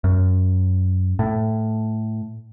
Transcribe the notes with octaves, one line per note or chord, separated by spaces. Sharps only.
F#2
A2